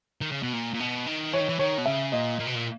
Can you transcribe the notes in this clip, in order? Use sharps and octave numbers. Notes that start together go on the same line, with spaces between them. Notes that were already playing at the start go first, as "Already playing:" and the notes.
D#3
C#3
B2
A#2
A#2
B2
D#3
E3 C#5
D#3
E3
D#3 C#5
B2
C#3 E5
A#2 D#5
A#2
B2
A#2